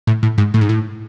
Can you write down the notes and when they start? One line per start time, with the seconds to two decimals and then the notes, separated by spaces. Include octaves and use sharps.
0.07 A2
0.23 A2
0.38 G#2
0.54 A2
0.61 G#2
0.69 A2